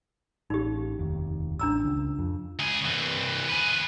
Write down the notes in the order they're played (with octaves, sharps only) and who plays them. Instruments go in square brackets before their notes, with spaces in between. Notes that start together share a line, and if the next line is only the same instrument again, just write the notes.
[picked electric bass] A1 [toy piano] D#4 G4
[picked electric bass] F1 D#2
[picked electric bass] A1 [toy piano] D4 A#5 E6
[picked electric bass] C#2
F2
[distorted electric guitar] C#2 G#4
C2 E3
G#4 B4